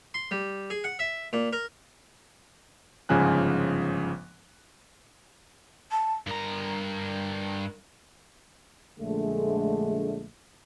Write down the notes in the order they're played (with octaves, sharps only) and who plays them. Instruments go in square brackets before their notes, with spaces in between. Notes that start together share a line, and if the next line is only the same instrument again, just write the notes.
[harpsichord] C6
G3
G#4
F#5
E5
A#2
A#4
[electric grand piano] G1 G#2 C#3 F3 G#5 F#6
[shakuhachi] A5
[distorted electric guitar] G2 A#5 [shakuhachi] A#4
[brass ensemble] A#1 D3 G#3 A3